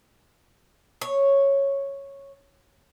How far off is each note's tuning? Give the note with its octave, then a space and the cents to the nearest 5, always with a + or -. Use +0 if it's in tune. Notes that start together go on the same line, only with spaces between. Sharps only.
C#5 -5